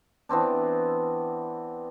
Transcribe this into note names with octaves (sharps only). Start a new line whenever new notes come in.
E3 B3 C4 D4